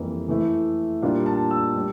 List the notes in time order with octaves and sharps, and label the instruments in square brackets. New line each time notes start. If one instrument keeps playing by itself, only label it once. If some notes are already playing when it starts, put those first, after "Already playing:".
Already playing: [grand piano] F2 E3 G3 A#3
E3 A3 E4
A#2 G3 A#3 D4 F4
A5
E6
G3